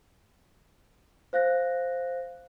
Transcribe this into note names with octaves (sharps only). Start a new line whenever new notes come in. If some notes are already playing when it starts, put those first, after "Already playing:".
C5 F5 F#6 A#6